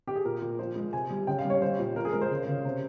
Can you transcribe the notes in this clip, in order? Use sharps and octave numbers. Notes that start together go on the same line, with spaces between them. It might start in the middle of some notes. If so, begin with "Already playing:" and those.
G4
G#4
A#2 A#4
A#2
F3 C5
G#3
C3 G#5
G3
C#3 G5
F5
G3
C#5
G3 C5
A#2
F3 A#4
G#4
G#3 A#4
C5
C#3
C#3
C3